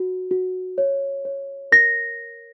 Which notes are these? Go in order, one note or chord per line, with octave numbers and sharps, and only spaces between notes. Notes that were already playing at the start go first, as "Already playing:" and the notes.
Already playing: F#4
F#4
C#5
C#5
A#4 A#6